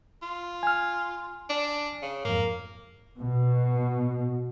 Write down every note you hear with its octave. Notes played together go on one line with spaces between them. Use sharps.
F4
G#5 F6
D4
C#3
F2 G#2 A#3
B2